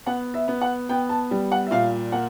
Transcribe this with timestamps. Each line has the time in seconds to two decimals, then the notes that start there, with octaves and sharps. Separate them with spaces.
0.06 B3 F#5
0.34 E5
0.48 B3
0.61 F#5
0.89 B3 G5
1.09 A5
1.31 G3
1.52 F#5
1.67 E5
1.71 A#2 F5
2.12 A#3 F#5